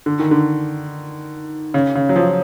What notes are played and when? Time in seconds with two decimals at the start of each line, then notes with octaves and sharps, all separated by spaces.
0.06 D3
0.19 D#3
0.31 D3
1.74 C#3
1.95 C#3
2.09 F#3
2.16 F3